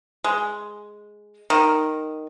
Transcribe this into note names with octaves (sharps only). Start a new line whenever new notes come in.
G#3
D#3